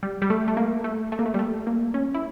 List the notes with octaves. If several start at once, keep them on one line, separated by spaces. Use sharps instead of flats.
G3
G3
A3
A3
A#3
A3
A3
A#3
A3
G3
A3
A#3
C#4
E4